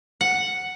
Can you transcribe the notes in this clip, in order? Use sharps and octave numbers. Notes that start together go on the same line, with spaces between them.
F#5